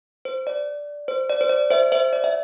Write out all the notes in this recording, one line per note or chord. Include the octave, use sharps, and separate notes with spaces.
C5
D5
C5
D5
C5
D5
C5 E5
C5 E5
D5
E5